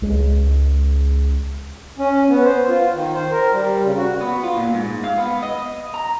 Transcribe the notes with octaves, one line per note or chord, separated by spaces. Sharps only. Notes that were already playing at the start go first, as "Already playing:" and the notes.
C#2 G#3
C#4
B3
C5
F4
D#3
C5
A#4
G3
C#3
F#4
B3
F4
A#2
G#2
F5
B3
D#5
A#5